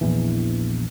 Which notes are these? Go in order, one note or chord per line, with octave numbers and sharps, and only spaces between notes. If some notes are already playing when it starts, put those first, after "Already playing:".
A#1 E2 E3